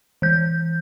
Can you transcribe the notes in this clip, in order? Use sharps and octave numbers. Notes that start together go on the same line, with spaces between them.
E3 G6